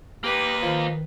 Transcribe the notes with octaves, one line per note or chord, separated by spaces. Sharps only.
A#3 D#4 G4 B4
D#3 F3